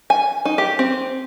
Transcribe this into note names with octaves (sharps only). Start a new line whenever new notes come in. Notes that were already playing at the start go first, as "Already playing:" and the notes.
G#5
D#4
G4
C4